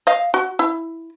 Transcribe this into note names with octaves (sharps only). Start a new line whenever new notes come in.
D#5 F5
F#4
E4